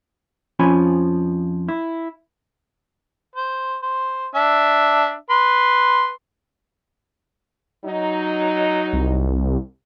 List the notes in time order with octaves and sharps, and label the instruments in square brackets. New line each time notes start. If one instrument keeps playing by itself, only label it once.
[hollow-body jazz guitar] F2 F3 C#4 F4 G#5 B5
E4
[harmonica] C5
C5
D4 E5
B4 C6
[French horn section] F#3 D#4
[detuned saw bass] C2